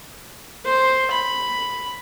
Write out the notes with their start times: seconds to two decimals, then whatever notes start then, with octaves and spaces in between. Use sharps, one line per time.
0.65 C5
1.11 B5